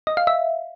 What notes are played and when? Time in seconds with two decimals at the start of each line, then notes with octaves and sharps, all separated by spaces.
0.07 D#5
0.17 F5
0.27 E5